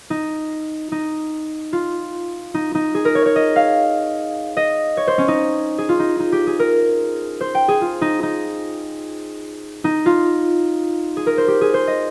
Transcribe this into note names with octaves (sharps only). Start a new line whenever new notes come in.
D#4
D#4
F4
D#4
D#4
G#4
A#4
C#5
C#5
D#5
F5
D#5
C#5
C5
C#4
D#4
G#4
F4
D#4
D#4
G4
G#4
A#4
C5
G5
G#4
F4
D#4
D#4
D#4
F4
G#4
A#4
C5
G4
G#4
C5
D#5